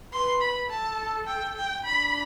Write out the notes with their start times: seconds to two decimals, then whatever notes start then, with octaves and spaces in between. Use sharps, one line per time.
0.13 B4 C6
0.41 B5
0.70 A4 A5
1.27 G5
1.56 G5
1.85 D4 B5